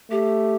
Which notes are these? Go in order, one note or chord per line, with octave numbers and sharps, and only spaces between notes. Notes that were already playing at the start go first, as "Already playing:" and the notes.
A3 G4